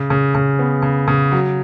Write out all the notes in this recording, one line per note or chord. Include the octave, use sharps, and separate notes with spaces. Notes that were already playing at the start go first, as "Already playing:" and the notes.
Already playing: C#3
C#3
C#3
B3
C#3
C#3
F#3